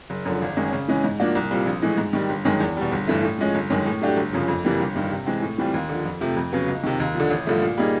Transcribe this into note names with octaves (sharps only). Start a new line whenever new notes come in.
F#1
F#2 D3 F3
G#1
F#2 D#3 G#3 C#4
C#3
E3 G#3 C#4
G#2
F3 A#3 D4 F#4
C2
A#2 G3 C4
A#1
A2 E3 G#3
G#2
D#3 G3
G1
F#2 D#3 G#3
E2
B2 G3
G1
G2 E3 A3
A2
F3 G#3 C#4
G1
F#2 D#3 G#3
A2
F#3 A3 D4 G4
G1
F#2 C#3 F3
F2
C3 E3 G3 A#3
G1
G2 D#3
C3
E3 G#3 C4
A2
E3 G3 C4 F4
D#2
D3 F3
F2
C3 F3 A3 C4
F2
C#3 F#3 B3
C#2
C3 D#3
D#2
D3 F3
A1
G2 D3 F3 A3
A#2
G3 A#3 D#4 G#4